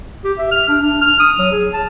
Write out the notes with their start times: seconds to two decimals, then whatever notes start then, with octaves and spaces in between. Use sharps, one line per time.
0.24 G4
0.39 E5
0.52 F6
0.68 D4
0.81 D4
1.02 F6
1.20 D#6
1.39 F#3
1.52 G#4
1.73 A5